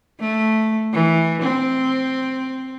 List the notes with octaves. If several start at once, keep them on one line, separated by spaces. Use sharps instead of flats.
A3
E3
C4